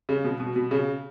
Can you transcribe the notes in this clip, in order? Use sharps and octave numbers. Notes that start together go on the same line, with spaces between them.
C#3
B2
B2
B2
C#3